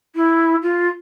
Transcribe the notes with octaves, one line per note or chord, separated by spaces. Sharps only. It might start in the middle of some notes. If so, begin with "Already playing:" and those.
E4
F4